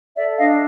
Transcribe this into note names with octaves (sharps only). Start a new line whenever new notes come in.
A4 D5 E5
D4 D#5 F5